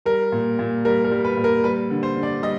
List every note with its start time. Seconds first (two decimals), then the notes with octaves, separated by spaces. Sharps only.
0.05 G3 A#4
0.32 A#2
0.59 A#2
0.85 G3 A#4
1.05 A#4
1.11 G3
1.24 B4
1.37 A#2
1.44 A#4
1.64 G3 B4
1.90 D3
2.03 C5
2.16 D3
2.23 D5
2.43 G3 D#5